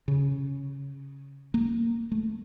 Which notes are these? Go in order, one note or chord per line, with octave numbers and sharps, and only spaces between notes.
C#3
A#3
A3